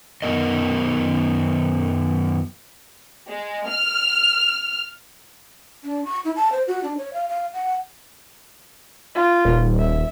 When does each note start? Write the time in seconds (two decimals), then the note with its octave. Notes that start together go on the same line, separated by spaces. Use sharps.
0.22 F#2 D#3 F#3 B3 A#4 D#5
3.28 G#3
3.69 F6
5.84 D4
6.05 C#6
6.25 E4
6.36 A5
6.52 C5
6.68 F#4
6.84 D4
6.98 C#5
7.14 F5
7.29 F5
7.54 F#5
9.15 F4
9.45 D#1
9.79 E5